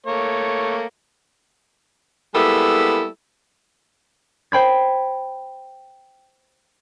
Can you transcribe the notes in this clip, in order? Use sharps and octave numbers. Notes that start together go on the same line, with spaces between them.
A3 A#3 C#5
G3 G#3 A#3 B3 E4 A4
C5 G5 B5 G#6